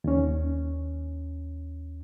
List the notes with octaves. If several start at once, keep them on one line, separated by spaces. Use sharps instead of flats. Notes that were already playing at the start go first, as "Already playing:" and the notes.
D#2 C#4